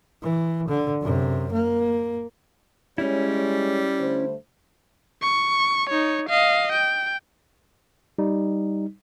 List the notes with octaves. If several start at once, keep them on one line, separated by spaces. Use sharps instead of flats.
E3
D3
F#2 C3
A#3
G3 G#3 C#4 E4 C#5
D3 A3 C5
C#6
D#4 C#5
D#5 F5
G5
G3 D#4